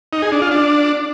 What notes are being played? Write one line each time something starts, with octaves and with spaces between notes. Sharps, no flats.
D#4
G#4
D4
F4
D4